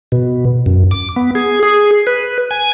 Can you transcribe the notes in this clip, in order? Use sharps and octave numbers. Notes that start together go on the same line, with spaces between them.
B2
F#2
D6
B3
G#4
G#4
B4
G#5